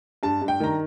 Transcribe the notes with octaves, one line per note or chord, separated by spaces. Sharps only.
G2 A5
G2
G5
D#3 A#5